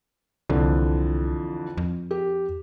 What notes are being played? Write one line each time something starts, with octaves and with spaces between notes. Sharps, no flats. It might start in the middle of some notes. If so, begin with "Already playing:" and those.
C2 F2 D3 E3
F2
G4